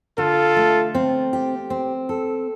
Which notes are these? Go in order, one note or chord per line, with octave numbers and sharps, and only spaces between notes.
D3 F4 A4
A3
C4
G4
C4
A4